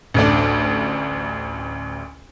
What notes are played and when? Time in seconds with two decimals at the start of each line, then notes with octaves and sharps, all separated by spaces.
0.14 A1 D2 D4